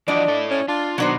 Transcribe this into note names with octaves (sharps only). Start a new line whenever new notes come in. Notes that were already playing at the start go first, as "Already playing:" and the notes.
E3 F3 D4 F#4 D5 D#5
E4 A4
C#4
D4 F4
B2 D#3 F#3 B3 D4 C5